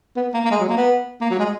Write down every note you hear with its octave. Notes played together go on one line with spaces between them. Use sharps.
B3
A#3
A#3
G#3
F#3
A#3
B3
A#3
F#3
G#3